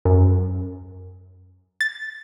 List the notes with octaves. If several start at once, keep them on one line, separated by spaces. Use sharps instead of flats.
F#2
A6